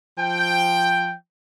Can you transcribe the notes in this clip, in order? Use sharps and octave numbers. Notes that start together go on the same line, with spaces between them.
F3 G5